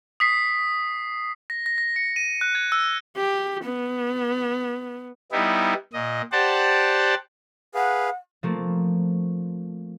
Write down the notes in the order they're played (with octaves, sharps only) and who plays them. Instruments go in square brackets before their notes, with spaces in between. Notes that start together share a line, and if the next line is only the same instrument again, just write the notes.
[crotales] D#6 B6 C7
A#6
A#6
A#6
C#7
D#7
F#6
G#6
E6
[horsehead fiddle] G4
B3
[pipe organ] G3 B3 D#4 E4
A#2 D#5
G4 C5 D5 F#5 A5
[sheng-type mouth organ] G#4 B4 F5 [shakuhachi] F#5
[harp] F3 A3 A#3 C4